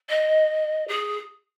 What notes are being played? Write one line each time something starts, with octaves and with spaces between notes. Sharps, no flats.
D#5
G#4